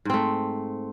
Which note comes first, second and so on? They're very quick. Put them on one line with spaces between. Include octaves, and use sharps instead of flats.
G#2 C4 A3